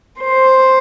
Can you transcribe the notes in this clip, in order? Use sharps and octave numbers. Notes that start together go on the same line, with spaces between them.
C5